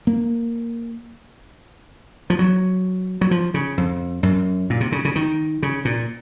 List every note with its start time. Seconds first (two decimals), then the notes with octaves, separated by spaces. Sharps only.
0.07 A#3
2.30 F3
2.39 F#3
3.21 F#3
3.31 F3
3.54 C#3
3.78 F2
4.23 F#2
4.70 A#2
4.80 C3
4.92 C#3
5.05 C#3
5.16 D#3
5.63 C#3
5.85 A#2